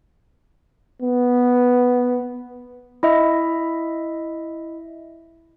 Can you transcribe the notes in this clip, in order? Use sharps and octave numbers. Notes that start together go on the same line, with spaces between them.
B3
E4 D#5 E5